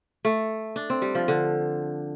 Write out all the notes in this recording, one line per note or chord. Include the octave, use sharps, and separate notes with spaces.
A3
D4
C4
G3
F3
D3